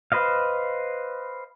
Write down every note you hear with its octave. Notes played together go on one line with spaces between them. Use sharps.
B4 C5 D#5 F5